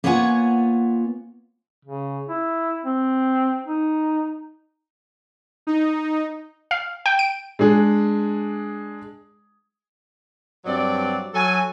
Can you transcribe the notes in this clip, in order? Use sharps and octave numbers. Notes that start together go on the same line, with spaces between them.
A#3 B3 F4 C#5 F#5 G#5
C#3
E4
C4
D#4
D#4
F5
G5
D7
G#3 D4 G#4
G2 F#3 C4 D5
F#3 A4 G#5